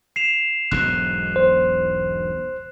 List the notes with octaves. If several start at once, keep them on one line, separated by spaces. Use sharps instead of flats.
C7 E7 F7
E1 B1 G#2 F#6
C5